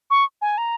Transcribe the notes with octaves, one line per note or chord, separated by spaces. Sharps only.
C#6
G#5
A#5